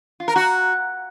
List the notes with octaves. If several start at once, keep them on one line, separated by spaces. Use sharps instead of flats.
F4
A#4
F#4